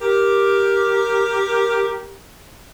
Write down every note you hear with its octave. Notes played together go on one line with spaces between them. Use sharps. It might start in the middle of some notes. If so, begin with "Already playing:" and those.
G4 A#4